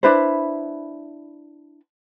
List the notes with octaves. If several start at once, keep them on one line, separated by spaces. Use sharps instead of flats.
D4 E4 B4 C5